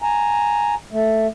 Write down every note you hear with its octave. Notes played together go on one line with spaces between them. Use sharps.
G#5 A#5
A3